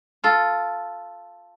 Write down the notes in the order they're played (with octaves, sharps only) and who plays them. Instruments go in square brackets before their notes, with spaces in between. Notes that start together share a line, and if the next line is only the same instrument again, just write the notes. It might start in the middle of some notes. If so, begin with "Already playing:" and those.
[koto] F4 A4